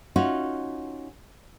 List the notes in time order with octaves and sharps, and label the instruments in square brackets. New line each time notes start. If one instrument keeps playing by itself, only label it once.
[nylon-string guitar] C#4 D#4 F4 F#4